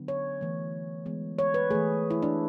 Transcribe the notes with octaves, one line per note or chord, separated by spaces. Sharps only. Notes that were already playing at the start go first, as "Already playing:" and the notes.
Already playing: D3 F#3 B3
C#5
E3 A3
E3 G#3 B3
C#5
B4
E3 A3 G#4
E4
D4